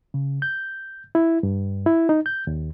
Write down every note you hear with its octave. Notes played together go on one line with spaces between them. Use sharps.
C#3
G6
E4
G2
E4
D#4
G6
D#2